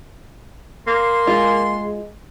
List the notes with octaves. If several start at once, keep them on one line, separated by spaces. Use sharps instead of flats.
A#3 C6
G#3 F4